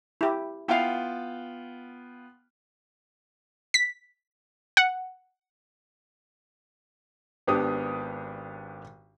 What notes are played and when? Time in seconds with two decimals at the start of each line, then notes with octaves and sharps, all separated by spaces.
0.21 E4 G4
0.69 B3 E4 F4 F5 G5
3.74 B6
4.77 F#5
7.47 G#1 B3 D4 G4 D#6